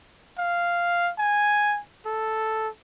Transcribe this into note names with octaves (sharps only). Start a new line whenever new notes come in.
F5
G#5
A4